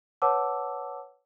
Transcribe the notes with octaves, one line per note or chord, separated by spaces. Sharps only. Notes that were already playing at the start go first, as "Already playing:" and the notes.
B4 C#5 F#5 A5 D6 E6